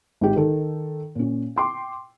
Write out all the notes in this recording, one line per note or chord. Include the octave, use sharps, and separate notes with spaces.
G#1 G4
D#3 A4
A#2 C#4
G5 C6 D6